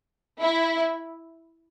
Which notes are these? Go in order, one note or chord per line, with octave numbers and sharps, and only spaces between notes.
E4